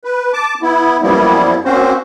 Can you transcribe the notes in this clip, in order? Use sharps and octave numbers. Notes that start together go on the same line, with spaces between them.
B4
A5 D6
B3 E4
F#2 F3 G3 A#3 B3 E4
A#3 C4 C#4 F#4 C5